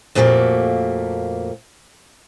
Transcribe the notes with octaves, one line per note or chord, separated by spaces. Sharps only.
F2 A#2 A3 A#3 F#4 G4